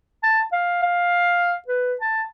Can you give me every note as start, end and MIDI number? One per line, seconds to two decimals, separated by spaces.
0.23 0.42 81
0.53 0.80 77
0.83 1.56 77
1.68 1.94 71
2.01 2.23 81